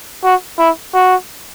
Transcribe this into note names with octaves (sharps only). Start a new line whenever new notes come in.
F#4
E4
F#4